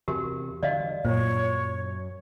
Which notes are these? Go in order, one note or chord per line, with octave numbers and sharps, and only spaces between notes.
E2 C3 F#4 G4 A#4
D3 E3 G3 D5 D#5 F5
F#2 A#2 F#3 C5 C#5